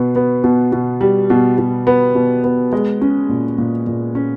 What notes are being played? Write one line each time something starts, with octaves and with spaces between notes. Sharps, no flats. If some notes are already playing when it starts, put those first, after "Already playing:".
Already playing: B2 B3
B3
B2
B2
G3
B2
B2
B3
B2
B3
G#3
C#4
A#2
A#2
A#2
C#4